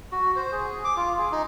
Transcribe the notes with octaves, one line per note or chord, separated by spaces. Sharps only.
F#4
C5
G#4
D6
F4
G#4
D#4